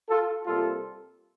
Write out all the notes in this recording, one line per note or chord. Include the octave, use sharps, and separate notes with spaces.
F4 A4
C3 G3 A#3 F4 A4